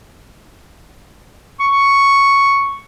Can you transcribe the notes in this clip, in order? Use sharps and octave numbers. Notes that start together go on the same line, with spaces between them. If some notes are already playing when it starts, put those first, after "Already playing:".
C#6